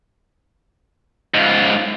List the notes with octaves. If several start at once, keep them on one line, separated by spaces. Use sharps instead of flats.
G#2 F4